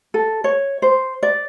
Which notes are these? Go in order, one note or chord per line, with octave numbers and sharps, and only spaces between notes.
A4
C#5
C5
D5